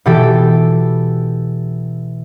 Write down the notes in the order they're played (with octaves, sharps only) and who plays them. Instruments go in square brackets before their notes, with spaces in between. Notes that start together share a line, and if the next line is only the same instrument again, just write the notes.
[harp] B2 E3 G4 A4 G5